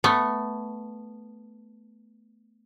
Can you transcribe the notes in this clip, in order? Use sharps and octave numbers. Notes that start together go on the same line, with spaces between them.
A3 B3